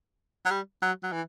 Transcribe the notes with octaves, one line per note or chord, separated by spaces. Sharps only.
F#3
G3
F#3
F#3
E3